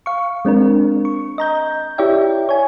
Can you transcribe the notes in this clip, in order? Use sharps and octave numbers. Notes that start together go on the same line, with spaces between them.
F5 C#6
G#3 C4 D4 A#4
C#6
D#5 A#5 G6
E4 G4 C#5 D5 E5 G5
C#5 G#5